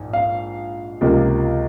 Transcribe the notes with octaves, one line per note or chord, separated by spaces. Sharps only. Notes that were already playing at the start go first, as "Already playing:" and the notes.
Already playing: A#1 G#2
F5
C#2 C3 F3 A#3